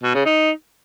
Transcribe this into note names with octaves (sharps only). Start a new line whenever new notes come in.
B2
C#3
D#4